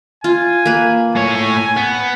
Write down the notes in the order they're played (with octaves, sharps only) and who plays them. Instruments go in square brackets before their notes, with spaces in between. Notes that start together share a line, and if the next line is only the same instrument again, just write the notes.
[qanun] F4 [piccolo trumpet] G#5
[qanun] A#3 B4
[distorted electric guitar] A2 C#5 [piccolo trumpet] G#5
[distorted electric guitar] B3